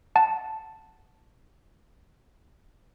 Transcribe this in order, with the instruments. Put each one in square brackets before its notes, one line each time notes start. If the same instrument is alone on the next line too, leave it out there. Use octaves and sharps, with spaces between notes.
[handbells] F#5 A5